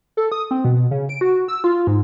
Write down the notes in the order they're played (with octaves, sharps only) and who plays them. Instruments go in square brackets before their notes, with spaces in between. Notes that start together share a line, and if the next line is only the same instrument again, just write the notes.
[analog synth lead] A4
D#6
C4
B2
C#3
D7
F#4
E6
F4
G#2